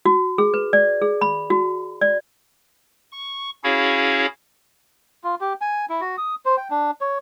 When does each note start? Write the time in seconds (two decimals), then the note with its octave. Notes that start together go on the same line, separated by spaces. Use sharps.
0.06 F#4
0.38 G#4
0.54 B4
0.73 D5
1.02 G#4
1.21 B5
1.50 F#4
2.01 D5
3.12 C#6
3.64 C#4 E4 F#4 G#4 C#5 F5
5.24 F4
5.41 G4
5.61 G#5
5.90 E4
6.01 F#4
6.18 D#6
6.45 C5
6.57 G5
6.70 D4
7.01 C#5